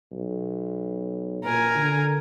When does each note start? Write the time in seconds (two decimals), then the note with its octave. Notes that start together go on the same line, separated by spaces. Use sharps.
0.12 B1
1.44 A#2 A#4 G#5
1.75 D3